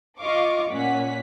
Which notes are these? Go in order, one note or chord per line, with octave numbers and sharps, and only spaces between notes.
F4 D#5 F5 C#6 D6
A#2 C#4 F#5 B6